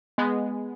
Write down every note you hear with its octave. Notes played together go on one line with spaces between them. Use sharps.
G#3 B3